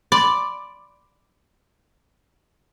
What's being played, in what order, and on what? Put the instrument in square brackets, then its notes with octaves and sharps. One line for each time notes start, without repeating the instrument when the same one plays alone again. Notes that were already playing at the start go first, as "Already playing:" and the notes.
[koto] D5 [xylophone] B5 C6